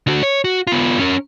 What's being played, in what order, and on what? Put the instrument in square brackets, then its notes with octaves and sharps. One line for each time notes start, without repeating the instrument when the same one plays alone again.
[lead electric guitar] D3 F#4
C#5
F#4
B3 F4
C#4 A#4